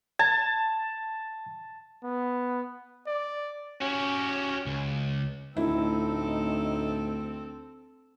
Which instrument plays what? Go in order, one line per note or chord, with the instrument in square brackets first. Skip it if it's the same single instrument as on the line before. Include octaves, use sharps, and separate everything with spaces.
[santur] A5 [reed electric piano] G#6
[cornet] B3
[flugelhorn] D5
[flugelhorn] C#4 [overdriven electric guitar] F#4 G4
[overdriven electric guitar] C#2
[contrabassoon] D2 [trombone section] A2 D#4 [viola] C4 A4 [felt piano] E4